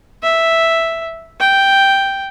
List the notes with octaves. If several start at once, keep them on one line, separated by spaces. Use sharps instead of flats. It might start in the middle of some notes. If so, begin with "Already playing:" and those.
E5
G5